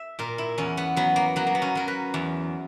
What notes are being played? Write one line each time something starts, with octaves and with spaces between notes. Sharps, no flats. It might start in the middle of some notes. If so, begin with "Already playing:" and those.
Already playing: E5
A#2 A#4
E4
E2 C#4
B3
F#3 B3
A#3
F#3 B3
A#3
B3
C#4
F#3 A#4
B4
E2